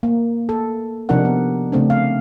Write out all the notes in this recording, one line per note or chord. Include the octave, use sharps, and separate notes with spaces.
A#3
A4
C3 F3 D4 D#4 A#4 F#5
B3
C#3 A3 C4 D4
F5